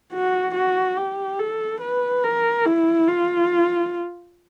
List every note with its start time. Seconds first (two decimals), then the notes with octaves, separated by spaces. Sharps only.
0.12 F#4
0.55 F#4
0.97 G4
1.39 A4
1.81 B4
2.23 A#4
2.66 E4
3.07 F4